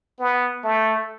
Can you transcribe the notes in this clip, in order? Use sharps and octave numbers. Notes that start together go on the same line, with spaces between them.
B3
A3